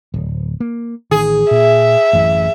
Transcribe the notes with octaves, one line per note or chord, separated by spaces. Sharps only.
D1
A#3
A1 D#3 G#4
A#2 E5
A1 F#2 E3